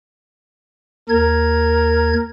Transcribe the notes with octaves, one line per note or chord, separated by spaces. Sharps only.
D#2 A#4 G#6